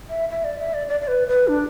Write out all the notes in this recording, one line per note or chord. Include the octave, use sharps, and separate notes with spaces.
E5
E5
D5
E5
D5
D5
D5
B4
B4
D4